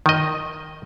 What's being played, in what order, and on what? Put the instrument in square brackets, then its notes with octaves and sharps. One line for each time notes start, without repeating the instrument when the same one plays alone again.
[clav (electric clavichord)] D#3 D#5